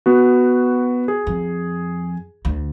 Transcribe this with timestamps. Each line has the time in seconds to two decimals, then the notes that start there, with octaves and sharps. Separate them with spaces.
0.06 B3 F#4
1.08 G#4
1.27 F2
2.45 D2